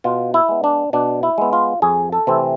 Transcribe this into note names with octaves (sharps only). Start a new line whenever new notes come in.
B2 F4
E4
G#3 B3
D4
B2 D4
E4
G#3 B3
F4
F2 G#4
A4
C3 E3 A3 C4